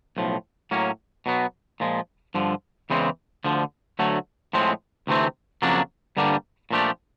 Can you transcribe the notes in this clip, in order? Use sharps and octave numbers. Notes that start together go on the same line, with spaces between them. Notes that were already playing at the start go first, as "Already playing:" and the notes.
B1 A2 F3
A2 F#3 A#3 C#4
B2 F#3 B3
A#2 F3 G#3
G2 D3 F3
E2 C#3 E3 G#3 C4
D2 D3 F3
D2 D3 F#3 A3
A2 F3 G#3 C4
D2 C3 E3 A3 C4
F2 C#3 F#3 A#3 D4
G2 D3 G3 A#3 D4
A#2 F3 A3 D4 G4